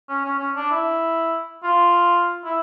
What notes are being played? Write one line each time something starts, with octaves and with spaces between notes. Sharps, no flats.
C#4
C#4
C#4
D4
E4
F4
E4